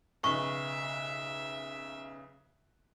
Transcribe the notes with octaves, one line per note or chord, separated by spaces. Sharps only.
B1 C#3 B4 E5 C#6